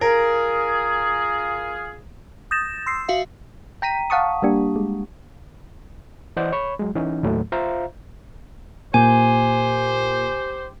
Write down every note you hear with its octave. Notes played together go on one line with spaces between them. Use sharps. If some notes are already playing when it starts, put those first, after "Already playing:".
F4 G#4 A#4
D#6 G6 A6 A#6 E7
C6 E6 C7
F#4 E5 F5
G5 A#5 B6 D#7
F5 F#5 A5 C#6 D#6
G3 A#3 D4 G4
G#3
E3 C5 D5 D#5 F#5 G6
C#5 B5 C#6
F#3 G#3
E3 C#4 D#4
D#2 A2 F#3 A3
F4 C5 E5 F5 A#5
A#2 G4 C5 G#5